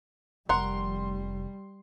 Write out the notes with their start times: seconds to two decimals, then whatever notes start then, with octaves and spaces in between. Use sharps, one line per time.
0.49 F1 G3 A#4 F#5 C6